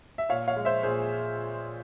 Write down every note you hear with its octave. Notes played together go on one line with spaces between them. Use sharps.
E5
A#2 C#5 F5
C#5 F5
G#3
C5 E5
A#2 G#4 C5